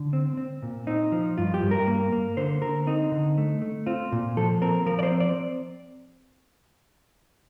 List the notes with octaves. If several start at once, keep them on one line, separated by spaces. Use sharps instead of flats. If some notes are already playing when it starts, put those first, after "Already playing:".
Already playing: D3
C4
C4
A#2
C4 D#4
F3
G2 F4
G4
G2
A#4
A#3
A#3
D3 C5
D3 A#4
C4 D#4
D3
A3
A3
C4 F4
A#2
F3 A4
C4 A#4
F3 A#4
D5
C5
C4
D5